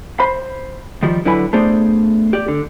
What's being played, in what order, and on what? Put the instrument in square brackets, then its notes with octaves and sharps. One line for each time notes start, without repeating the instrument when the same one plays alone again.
[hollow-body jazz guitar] C5 B5
D#3 F3 G3
D3 F#3 E4 B4 G#5 B5
A3 B3 D4 G#4 C5 D5
G4 D5
D3